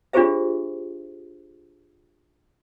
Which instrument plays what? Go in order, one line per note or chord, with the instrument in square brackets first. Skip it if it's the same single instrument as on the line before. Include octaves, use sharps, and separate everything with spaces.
[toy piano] D4 F4 G4 G#4 C5 E5